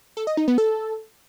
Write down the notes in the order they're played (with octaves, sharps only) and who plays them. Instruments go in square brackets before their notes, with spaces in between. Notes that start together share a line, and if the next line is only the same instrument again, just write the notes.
[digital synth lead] A4
D#5
D#4
B3
A4